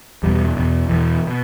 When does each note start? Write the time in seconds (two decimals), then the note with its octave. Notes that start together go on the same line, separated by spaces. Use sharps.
0.23 E2 B2 G3
0.56 E2 B2
0.89 E2 B2 E3
1.27 B2